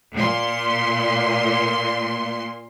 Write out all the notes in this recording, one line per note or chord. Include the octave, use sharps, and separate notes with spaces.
A#2 C6